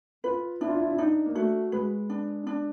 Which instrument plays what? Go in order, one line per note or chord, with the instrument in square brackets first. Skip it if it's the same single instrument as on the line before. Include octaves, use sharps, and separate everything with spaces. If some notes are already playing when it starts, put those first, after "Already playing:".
[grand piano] F4 [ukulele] B4
[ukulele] D4 [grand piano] E4
[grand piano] F4
E4
F4
E4
[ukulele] D4 [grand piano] D#4
[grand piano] A#3
[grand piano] A3 [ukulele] F#4
[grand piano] G#3 [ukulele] B4
[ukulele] D4
D4